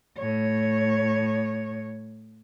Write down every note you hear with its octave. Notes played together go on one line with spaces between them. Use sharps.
A2 C#5